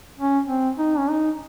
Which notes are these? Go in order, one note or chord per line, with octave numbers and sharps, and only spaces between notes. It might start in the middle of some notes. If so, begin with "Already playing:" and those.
C#4
C4
D#4
C#4
D#4